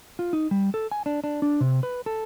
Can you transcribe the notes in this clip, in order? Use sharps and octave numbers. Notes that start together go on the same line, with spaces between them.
F4
D#4
G3
A4
G#5
D4
D4
D4
C3
B4
A4